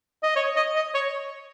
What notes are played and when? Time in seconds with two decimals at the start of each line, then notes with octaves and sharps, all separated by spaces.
0.23 D#5
0.36 C#5
0.56 D#5
0.75 D#5
0.94 C#5